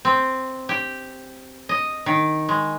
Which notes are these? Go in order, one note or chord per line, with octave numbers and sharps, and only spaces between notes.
C4
G4
D#5
D#3
G#3